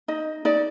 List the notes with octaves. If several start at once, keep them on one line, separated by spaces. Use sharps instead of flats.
D#4 D#5
D#4 D5